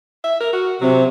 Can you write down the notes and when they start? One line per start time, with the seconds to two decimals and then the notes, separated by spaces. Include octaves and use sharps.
0.24 E5
0.40 A#4
0.53 F#4
0.81 C3 F#3